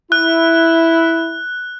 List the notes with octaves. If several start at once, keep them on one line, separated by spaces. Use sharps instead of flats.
E4 F#6